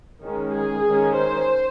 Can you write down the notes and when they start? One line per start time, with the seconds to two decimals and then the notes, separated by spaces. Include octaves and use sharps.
0.23 D#3 G#3 C#4
0.54 G#4
0.85 D#3 G#3 C#4
1.17 C5